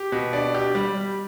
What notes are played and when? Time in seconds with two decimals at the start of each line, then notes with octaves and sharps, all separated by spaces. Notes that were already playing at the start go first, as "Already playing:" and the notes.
Already playing: G4
0.12 B2
0.33 D4
0.54 G4
0.75 G3